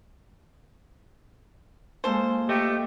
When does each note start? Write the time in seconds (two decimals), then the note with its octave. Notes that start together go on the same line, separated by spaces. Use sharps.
2.04 G#3 A#3 F4 A4 C5
2.49 A3 G4 D#5